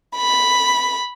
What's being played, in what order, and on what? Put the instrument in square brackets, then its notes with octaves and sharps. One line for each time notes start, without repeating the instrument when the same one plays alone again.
[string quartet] B5